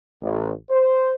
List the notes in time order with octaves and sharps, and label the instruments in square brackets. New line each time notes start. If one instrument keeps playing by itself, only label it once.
[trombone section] A1
C5